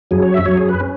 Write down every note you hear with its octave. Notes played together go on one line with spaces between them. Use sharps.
F#2 F#3 G#4
C#5
E5
F#2 F#3 C#5
G#4
B4
C#4